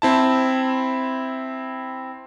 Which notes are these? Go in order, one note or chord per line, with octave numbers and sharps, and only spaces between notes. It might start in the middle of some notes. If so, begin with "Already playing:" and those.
C4 E4 A5